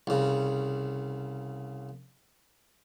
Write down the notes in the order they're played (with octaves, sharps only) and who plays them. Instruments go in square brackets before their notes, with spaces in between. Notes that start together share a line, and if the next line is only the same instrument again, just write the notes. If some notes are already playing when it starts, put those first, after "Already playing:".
[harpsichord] C2 C#3